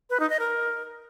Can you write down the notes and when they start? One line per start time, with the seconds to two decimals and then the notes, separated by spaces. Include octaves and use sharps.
0.10 B4
0.20 D#4
0.30 D#5
0.40 A#4